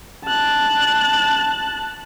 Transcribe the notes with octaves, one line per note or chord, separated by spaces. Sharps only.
A5 F#6